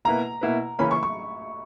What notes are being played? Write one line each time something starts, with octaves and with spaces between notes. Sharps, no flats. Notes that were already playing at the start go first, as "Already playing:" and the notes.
B2 A#3 E4 B4 A#5
B2 A#3 E4 B4
C#3 E3 A#3 C#4 B5
C#6
C#6